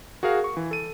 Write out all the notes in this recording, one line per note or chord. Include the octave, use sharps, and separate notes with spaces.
F#4 G#4 A#4 F5
C#6
E3
A4 D#7